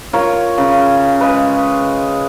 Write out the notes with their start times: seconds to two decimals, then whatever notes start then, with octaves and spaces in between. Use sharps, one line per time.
0.13 F4 A#4 C#5
0.58 C#3
1.21 G#3 B4